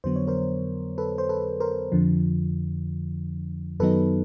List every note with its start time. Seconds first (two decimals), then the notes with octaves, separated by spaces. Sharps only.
0.04 F2 D3 F#3 B3 C5
0.16 C#5
0.27 A#4 C5
0.98 A4 B4
1.18 C5
1.29 A4 B4
1.60 A#4 C5
1.92 F2 D3 F3
3.80 F#2 D#3 F#3 B3 D#4 A4 B4